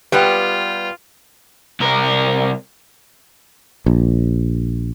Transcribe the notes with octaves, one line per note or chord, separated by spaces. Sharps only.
G3 B3 F4 G4 B4 G5
C2 A#4
A#1